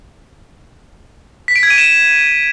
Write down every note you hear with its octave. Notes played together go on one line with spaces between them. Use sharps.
B6
D7
G#6
D#7
E7